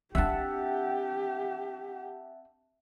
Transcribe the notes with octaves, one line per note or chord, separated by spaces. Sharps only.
C4 D4 G4 E5 F#5 A5